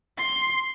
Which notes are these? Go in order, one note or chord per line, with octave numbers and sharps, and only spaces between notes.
C6